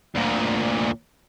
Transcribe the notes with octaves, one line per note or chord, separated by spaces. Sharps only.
D2 A#2